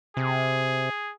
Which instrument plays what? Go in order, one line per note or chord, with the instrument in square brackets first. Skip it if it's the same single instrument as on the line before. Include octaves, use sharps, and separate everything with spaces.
[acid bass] C3 [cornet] G#4